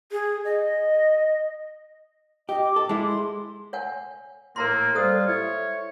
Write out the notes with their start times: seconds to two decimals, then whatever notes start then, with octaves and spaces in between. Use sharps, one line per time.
0.12 G#4
0.45 D#5
2.49 G4 D#5
2.63 D6
2.76 A4
2.89 G#3 E4
3.08 C6
3.73 C#5 F#5 G#5
4.56 A2 A#3 A#4 A#5 C6
4.95 G3 F4 A4 C5 D#6
5.27 E4 C#5